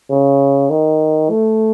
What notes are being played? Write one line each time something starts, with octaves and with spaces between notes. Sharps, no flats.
C#3
D#3
A3